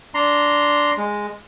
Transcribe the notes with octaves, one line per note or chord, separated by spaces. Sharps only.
D4 A#5 C6
G#3